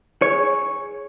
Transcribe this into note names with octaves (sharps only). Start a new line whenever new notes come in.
G#4 C#5